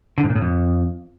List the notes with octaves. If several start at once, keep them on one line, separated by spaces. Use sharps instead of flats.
D3
G#2
A#2
A2
F2